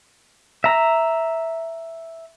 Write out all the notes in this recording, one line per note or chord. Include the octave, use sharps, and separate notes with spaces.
E5 A#5